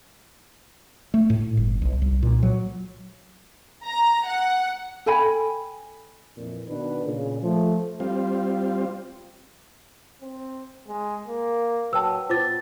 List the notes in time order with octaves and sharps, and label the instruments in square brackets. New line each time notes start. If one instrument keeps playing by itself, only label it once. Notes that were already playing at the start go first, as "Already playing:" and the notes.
[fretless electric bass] A3
A2
G1
B1
C2
A#2
F#3
[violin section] A#5
F#5
[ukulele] A4 G5 G#5 B5
[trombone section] F2 A#2 E3
B2 D#3 D4 B4
A#2 C#3
F3 A3
[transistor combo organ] G3 C4 F4
[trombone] C4
G#3
A#3
[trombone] F#3 [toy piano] B4 G5 A5 [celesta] E6
[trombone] B3 [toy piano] F4 D6 [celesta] C5 A6